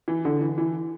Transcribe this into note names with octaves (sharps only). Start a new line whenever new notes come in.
E3
D3
E3
E3